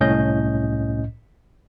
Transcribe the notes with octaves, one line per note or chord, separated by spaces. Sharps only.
C2 A2 C#4 D#5 G6